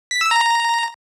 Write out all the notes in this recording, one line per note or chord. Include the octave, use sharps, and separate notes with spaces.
B6
E6
A#5
A#5